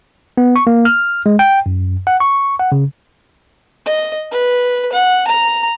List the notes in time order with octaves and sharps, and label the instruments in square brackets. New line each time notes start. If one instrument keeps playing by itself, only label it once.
[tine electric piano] B3
C#6
A#3
F6
G#3
G5
F#2
F#5
C#6
F#5
C#3
[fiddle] D#5
B4
F#5
A#5